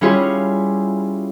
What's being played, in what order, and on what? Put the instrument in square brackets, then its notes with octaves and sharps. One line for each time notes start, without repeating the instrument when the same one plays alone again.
[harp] G3 C#4 E4 F4 G#4 C#5